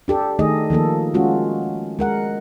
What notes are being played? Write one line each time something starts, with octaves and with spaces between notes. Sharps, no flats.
D4 G4 A4
D#3 A3 D#4 G#4 D#5
D#3 F3 A#3 A4
G#3 C#4 F4 F#4
G#3 A#4 F#5